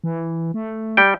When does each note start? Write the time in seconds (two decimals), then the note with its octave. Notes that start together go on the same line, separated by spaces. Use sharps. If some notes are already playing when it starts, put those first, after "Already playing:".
0.04 E3
0.54 A3
0.97 G3 G5